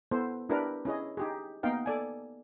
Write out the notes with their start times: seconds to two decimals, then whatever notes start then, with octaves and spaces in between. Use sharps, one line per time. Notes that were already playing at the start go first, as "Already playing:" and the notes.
0.11 B3 E4 A4 C5
0.49 D4 E4 G4 A#4 B4 D5
0.85 C#4 E4 G#4 D#5
1.17 D#4 G4 G#4
1.63 A#3 B3 D#4 F5 G5
1.86 A4 D5 G#5